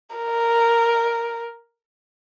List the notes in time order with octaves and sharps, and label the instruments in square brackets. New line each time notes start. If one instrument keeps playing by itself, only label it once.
[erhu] A#4